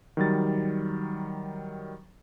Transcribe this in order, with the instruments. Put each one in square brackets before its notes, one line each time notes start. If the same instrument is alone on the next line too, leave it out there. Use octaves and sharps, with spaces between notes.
[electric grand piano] D#3 F#3 G3 A6